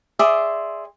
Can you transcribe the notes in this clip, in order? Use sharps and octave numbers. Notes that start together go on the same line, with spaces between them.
G#4 D5 E5 C6